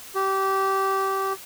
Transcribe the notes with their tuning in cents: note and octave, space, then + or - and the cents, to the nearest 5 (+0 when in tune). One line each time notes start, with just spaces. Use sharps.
G4 -20